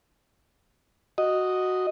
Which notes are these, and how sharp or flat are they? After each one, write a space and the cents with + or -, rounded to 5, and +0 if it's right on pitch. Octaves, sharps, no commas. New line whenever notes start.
F#4 +0 D#5 +0